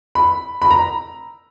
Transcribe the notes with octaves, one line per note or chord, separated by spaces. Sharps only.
B5
B5
A#5